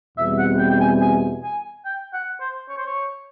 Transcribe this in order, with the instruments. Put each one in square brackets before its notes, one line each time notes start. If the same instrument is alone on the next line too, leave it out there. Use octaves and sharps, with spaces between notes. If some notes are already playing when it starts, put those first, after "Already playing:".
[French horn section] E2 B2 G3 C4 E4 [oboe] E5
[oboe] F#5
G5
G5
G#5
G#5
G#5
G5
F#5
C5
C#5
C5
C#5